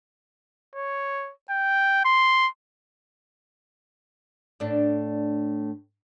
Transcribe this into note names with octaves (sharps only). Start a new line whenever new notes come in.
C#5
G5
C6
A2 D4